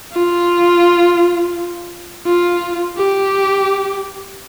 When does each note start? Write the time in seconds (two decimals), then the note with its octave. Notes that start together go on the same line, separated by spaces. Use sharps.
0.13 F4
2.26 F4
2.97 G4